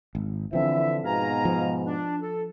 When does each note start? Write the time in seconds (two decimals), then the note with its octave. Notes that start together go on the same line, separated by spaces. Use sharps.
0.15 G#1
0.53 D3 E3 F3 C4 E5
1.04 G#2 B2 F5 G#5 A#5
1.45 F3
1.85 D4
2.21 A4